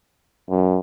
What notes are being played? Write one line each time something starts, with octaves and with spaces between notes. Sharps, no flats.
F#2